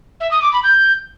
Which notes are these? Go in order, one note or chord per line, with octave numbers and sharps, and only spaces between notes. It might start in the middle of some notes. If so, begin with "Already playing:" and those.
E5
D#6
D6
B5
G6